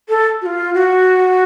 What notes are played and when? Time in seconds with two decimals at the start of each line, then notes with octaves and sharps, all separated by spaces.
0.09 A4
0.42 F#4
0.46 F4
0.74 F#4